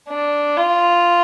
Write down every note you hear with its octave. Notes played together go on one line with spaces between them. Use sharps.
D4
F4